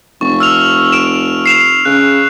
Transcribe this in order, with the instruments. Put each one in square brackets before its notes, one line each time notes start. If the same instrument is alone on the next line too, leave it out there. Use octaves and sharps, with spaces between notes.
[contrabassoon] F1 [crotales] C#6
[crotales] E6 F6 F7
E6 D7 E7
C7 E7 F7
[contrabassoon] C#3 [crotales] F#6